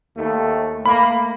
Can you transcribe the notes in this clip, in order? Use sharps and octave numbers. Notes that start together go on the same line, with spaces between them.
D#2 A3
A3 A#3 B5